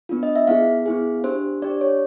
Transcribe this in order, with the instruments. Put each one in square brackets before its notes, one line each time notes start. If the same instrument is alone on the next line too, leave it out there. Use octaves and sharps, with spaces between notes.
[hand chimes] B3 D4 F4
D#5
E5
B3 E4 G#4 F5
B3 E4 G#4
D4 G4 C5
D4 G4 D5
C#5